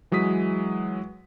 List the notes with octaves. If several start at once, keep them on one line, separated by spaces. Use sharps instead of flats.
E3 F#3 G#3 D#6 B6